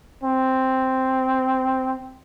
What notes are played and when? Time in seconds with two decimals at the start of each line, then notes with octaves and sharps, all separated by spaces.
0.24 C4